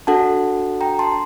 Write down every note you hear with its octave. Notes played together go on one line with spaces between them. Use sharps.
D4 F#4 A4 F#5 A5
G5 A#5
A5 C6